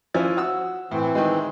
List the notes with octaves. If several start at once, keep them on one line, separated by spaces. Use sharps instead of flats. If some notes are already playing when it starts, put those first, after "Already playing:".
F3 C#4 E4
F#4 E6
A2 E3 C4
D#3 G#3